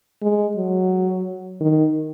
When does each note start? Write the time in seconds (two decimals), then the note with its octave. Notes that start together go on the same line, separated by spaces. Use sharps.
0.22 G#3
0.56 F#3
1.60 D#3